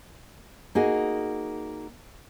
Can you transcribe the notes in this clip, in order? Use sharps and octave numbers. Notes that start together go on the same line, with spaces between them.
A#3 D#4 F#4 G#4